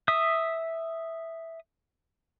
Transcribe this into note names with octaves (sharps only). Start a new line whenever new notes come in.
E5 D#6